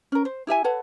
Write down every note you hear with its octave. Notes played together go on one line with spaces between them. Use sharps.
C#4 A#4
C5
E4 G4 E5 G#5
A4 B4 C#5 F#5